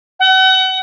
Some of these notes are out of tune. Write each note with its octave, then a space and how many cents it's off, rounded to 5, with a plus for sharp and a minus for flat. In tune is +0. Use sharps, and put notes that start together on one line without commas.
F#5 +35